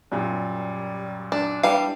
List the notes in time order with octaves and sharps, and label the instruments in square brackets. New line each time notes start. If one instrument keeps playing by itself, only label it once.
[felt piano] F#2 A#2 [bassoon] G3
[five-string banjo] D4
[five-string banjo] E3 G3 [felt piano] D4 [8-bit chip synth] F5